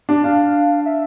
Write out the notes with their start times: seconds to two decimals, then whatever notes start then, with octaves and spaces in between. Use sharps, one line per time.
0.09 D4
0.24 D4 F5
0.85 E5